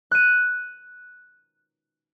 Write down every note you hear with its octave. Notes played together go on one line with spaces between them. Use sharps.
F#6 D#7